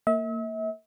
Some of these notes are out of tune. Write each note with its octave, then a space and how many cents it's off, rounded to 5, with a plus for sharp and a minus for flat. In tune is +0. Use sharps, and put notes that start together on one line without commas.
A#3 -25 E5 -40